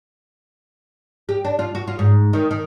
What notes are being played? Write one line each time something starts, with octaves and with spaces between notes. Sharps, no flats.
G4
D4
F4
F#4
F4
G#2
D#3
D#3